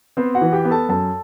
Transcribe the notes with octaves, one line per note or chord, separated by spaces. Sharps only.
B3 C4 C5
F#4 F#5
E3
G4 G5
B3
A4 A5
F#2 A4 A5